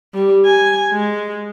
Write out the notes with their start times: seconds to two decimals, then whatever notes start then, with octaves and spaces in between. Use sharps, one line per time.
0.14 G3
0.45 G#5
0.92 G#3